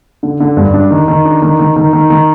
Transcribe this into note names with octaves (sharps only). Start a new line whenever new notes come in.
D3
D3
G2
D4
D#3
D#3
D4
D#3
D#3
D#3
D#3
D#3